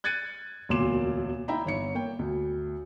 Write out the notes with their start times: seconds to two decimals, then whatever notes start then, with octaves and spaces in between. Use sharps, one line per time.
0.04 F#6 G#6 A6 C#7 D#7
0.69 E1 D2 A#2 C6 D6 E7
1.48 D#4 E4 E5 G5 A#5 B5
1.66 G1 C#5 C#7
1.95 A#3 C#5 G5
2.19 D2